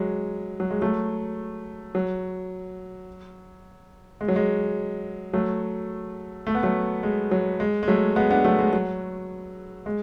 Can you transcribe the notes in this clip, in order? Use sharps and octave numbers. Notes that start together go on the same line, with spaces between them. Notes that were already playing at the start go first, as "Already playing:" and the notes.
Already playing: F#3 G#3
F#3
G#3
F#3 A3
F#3
G#3
F#3
G#3
F#3 A3
A3
B3
F#3 A3
G#3
F#3
G#3
G#3
F#3 A3
G#3 B3
B3 D4
F#3 A3
G#3
F#3
G#3